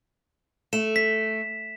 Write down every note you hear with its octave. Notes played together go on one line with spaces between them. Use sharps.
A3 E7
B6